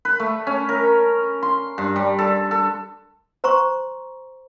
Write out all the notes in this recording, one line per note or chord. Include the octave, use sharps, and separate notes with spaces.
B4
A3
C#4
A#4
C6
G2
G3
A4
A4
C5 A#5 C6 C#6